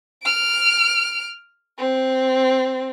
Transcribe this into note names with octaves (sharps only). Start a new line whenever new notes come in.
F6 D7
C4